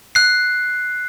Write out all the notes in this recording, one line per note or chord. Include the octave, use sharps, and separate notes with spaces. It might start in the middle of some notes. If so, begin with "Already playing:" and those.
F#6 C7